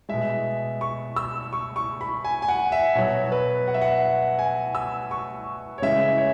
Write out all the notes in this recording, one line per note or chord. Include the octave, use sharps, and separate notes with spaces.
B2 G#3 E5
C#6
E6
C#6
C#6
B5
G#5
G#5
F#5
E5
B2 F#3 C#5
B4
F#5
E5
F#5
G#5
E6
C#6
C#5
C#3 E3 G#3 E5
C#5